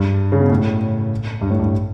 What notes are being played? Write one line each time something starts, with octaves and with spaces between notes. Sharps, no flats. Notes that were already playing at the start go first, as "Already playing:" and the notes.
Already playing: G2
C#3
B2
A2
G2
A2
G2